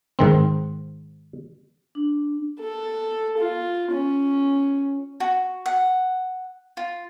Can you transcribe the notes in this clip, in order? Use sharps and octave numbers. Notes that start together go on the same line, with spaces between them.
G#2 D#3 C4
D4
A4
F4
C#4
F#4
F#5
F4